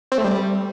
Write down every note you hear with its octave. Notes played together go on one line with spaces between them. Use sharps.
C4
A3
G3